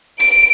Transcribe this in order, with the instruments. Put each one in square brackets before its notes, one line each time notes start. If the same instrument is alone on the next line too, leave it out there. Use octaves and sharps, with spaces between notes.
[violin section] D7